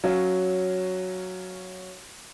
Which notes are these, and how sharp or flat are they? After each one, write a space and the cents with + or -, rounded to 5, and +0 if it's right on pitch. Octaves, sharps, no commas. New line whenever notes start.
F#3 +0 C#4 +0 F5 +0